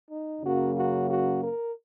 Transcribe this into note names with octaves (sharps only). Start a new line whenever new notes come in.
D#4
F#2 C#3 F#3 A#3 F#4
F#4
F#4
A#4